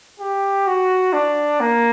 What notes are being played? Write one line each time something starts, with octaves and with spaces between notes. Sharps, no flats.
G4
F#4
D4
A#3